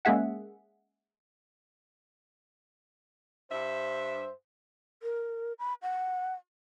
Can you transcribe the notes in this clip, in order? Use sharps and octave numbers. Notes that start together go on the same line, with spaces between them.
G#3 A#3 C#4 G#4 E5 F#5
G2 C5 E5
A#4
B5
F#5